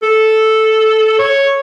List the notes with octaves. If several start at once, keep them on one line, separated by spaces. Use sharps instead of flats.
A4
C#5